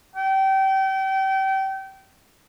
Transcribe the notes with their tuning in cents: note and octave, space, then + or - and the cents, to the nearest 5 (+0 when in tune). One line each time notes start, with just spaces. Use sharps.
G5 -30